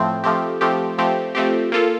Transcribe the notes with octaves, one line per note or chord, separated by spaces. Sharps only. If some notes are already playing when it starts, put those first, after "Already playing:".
Already playing: A2 F3 A3 C4
F3 A3 C4 G4
F3 A3 C4 G4
F3 A3 C4 G4
F3 A3 C4 G4
A#3 F4 A4